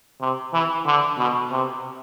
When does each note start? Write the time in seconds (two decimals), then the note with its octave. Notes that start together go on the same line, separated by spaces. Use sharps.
0.21 C3
0.53 E3
0.86 D3
1.18 B2
1.51 C3